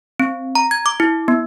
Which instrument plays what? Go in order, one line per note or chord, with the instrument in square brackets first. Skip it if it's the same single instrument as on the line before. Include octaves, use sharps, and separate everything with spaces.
[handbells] C4
A#5
G#6
D6
E4
B3